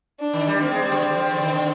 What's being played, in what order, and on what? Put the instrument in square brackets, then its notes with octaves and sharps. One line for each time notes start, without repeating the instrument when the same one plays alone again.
[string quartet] D4
[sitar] D#3
G3
[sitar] A#3 [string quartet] C4
[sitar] G#3
G3
D3
G3
F3
D3
D#3
D3